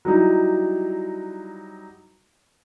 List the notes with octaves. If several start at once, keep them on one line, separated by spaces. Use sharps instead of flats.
F#3 G3 D#4 E4